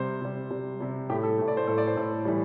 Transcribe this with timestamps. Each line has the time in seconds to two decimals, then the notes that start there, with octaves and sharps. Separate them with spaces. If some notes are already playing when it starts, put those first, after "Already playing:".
Already playing: C3 G3 C5
0.21 C3 G3
0.50 C3 G3
0.80 C3 G3
1.10 A2 A3 G4
1.23 A4
1.38 A2 A3
1.48 D5
1.57 C5
1.67 A2 A3 A4
1.78 D5
1.87 C5
1.97 A2 A3 A4
2.25 A2 E3 G3